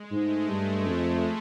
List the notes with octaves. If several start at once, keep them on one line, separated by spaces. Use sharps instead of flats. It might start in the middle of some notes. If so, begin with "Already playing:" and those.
Already playing: G#3
G#2 A3
G2
F2